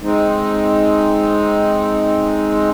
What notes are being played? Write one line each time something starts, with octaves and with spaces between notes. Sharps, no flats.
G#3 C4 D#4